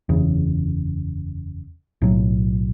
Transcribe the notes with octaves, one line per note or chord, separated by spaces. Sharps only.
F#1 E2 C#3
B1 A2 F#3